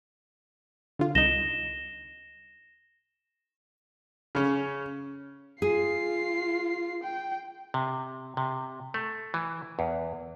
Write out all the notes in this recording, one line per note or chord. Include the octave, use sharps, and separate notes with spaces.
D3 F4
C2 D#4 A#6 E7 G7
C#3 C#4
F4 G#4 C7
G5
C3
C3
A3
E3
E2